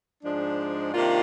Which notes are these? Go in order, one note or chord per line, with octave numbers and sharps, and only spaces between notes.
G#2 F3 G#3 D4
C3 D#3 A#3 D4 F4